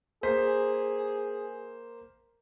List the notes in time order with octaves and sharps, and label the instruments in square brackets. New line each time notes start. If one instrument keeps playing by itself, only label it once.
[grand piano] A#3 C5 B6 [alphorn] G#4